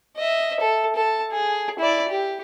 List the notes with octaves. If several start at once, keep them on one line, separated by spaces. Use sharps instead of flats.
D#5 E5
A4
A4 A5
G#4
E4 D5
G4